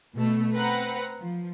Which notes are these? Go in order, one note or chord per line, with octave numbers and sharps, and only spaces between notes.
B2 A3
C4 B4 F#5 A#5
F3